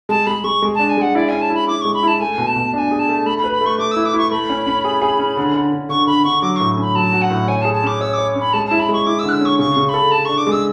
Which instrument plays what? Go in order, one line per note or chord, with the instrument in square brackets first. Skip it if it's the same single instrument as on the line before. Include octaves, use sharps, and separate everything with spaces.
[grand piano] G#3 [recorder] A5
[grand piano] G#3 [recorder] B5
[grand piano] G#3 [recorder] C#6
[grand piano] G#3
[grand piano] D4 [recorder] A5
[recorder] G#5
[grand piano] G#3 [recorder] F#5
[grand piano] E4 [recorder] D5
[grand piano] C#4 [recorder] G#5
[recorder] A5
[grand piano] E4
[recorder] B5
[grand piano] E4 [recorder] D6
[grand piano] G#3 [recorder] C#6
[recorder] B5
[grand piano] E4 [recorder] A5
[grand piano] A3 [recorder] G#5
[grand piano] B2
[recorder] A5
[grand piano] B2
[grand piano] D4 [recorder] A5
[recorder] G#5
[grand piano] G#4
[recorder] A5
[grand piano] A3
[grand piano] A3 [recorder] B5
[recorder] B5
[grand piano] B4
[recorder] B5
[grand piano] A3 [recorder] C#6
[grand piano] A3 [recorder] D6
[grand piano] E4 [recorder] E6
[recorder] D6
[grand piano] E4 [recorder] C#6
[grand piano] A3 [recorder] B5
[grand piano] C#4
C#4
G#4
G#4
C#4
D3
D3
D3
[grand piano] D3 [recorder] C#6
[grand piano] D3 [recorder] B5
[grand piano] D3 [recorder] C#6
[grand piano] F#3 [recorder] D6
[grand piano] A2 [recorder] C#6
[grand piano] C#4 [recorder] B5
[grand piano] F#3 [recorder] A5
[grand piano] F#4
[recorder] F#5
[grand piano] A2
[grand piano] C#5 [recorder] G#5
[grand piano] G#4 [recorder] A5
[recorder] A5
[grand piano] C#4 [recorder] D6
[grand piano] C#5 [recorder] E6
[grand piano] C#5 [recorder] D6
[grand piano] C#4
[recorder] B5
[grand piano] G#3 [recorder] A5
[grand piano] E4 [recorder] A5
[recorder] B5
[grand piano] G#3 [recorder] C#6
[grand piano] E4 [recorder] D6
[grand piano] D3 [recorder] E6
[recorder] F#6
E6
[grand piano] C#4 [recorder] C#6
[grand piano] C#3 [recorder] C#6
[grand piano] C#3
[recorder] C#6
[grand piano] A4 [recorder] B5
[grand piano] A4 [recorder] A5
[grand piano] D4 [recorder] C#6
[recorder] D6
[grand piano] G#3
[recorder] E6